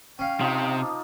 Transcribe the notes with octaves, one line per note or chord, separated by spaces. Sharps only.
C#4 F5 G5
C3 F3 D#4
D6